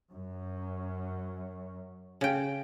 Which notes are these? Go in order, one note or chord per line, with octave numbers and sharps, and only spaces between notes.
F#2
C#3 G5